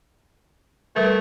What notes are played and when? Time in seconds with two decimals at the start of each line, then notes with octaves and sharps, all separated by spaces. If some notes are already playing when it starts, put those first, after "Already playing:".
0.96 G3 A3 A#4 B4